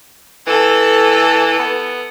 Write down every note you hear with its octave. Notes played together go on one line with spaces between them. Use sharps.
E3 A4
B3